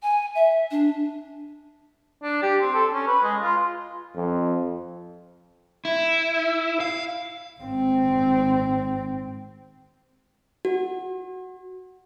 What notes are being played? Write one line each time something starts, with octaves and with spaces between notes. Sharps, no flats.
G#5
E5
D4
D4
G4
C4
A4
C#4
B4
G#3
F4
F2
E4
F5
G#1 C4
F#4